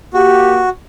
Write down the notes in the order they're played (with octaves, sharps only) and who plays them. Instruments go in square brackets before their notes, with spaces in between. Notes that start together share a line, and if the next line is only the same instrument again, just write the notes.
[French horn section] A#3 G4 [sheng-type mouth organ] F#4